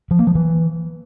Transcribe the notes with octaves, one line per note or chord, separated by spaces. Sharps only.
F3
A#3
F3
E3